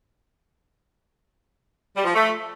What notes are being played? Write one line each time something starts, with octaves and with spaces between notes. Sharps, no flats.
G3
F3
A3